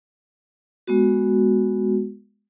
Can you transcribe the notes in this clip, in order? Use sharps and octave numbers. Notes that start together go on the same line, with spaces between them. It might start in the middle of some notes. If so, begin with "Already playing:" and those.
G#3 B3 F#4